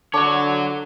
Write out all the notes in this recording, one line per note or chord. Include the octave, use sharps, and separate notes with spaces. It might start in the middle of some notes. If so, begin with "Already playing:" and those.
D3 F#4 C#5 A5 D6